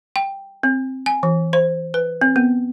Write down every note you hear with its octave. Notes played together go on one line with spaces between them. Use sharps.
G5
C4
G#5
E3
C5
B4
C4
B3